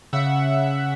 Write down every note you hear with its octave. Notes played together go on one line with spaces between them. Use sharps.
C#3 E5 F#5